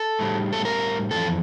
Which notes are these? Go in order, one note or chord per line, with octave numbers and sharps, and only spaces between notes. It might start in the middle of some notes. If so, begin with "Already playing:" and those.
Already playing: A4
A2 G3
A4
A#4
F2 E3 A4